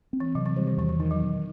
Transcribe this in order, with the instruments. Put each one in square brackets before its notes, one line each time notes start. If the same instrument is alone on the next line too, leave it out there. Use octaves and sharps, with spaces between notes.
[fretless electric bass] C4
[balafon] E3
[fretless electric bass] C3 [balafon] F#3
[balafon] E3
[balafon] D#3 [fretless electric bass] G3
[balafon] D#3
[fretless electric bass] E2 [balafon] E3
[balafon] E3
[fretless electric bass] D#3 [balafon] E3
[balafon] F#3
[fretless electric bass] B2